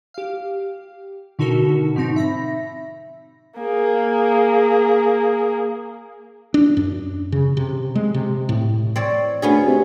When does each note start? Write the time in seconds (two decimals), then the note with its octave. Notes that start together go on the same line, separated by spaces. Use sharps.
0.14 G4 F5
1.39 B2 D3 D#4 F#4 A4 A#4
1.95 G#2 B2 F3 C4 D#4
2.16 E5 B5 A#6
3.59 A#3 G#4
6.54 D4
6.77 F#2
7.32 C#3
7.57 C3
7.95 G#3
8.14 C3
8.49 A2
8.96 C4 C#5 D5
9.42 D2 B3 C#4 G#4
9.68 C3